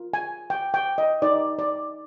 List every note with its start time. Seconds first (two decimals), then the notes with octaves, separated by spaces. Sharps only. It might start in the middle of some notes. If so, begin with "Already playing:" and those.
Already playing: F4 A#4
0.14 G#5
0.50 G5
0.74 G5
0.98 D#5
1.22 D#4 A#4 D5
1.59 D5